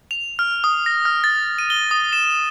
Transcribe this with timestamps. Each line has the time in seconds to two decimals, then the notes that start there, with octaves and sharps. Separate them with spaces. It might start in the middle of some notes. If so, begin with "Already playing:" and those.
0.11 F7
0.39 F6
0.64 D#6
0.86 A#6
1.05 F6
1.24 A6
1.59 D#7
1.70 G7
1.91 D#6
2.13 E7